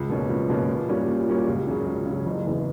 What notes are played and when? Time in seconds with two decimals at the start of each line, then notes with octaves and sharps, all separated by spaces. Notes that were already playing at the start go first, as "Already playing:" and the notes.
Already playing: C#2
0.10 B2 A#3 C#4
0.29 C#2
0.49 B2 A#3 C#4
0.68 A#2
0.88 G3 A#3 C#4 F#4
1.08 A#2
1.28 G3 A#3 C#4 F#4
1.47 C#2
1.66 C#3 F#3 C#4
1.86 C#2
2.06 C#3 F#3 C#4
2.26 F#1
2.46 E2 C#3 E3 B3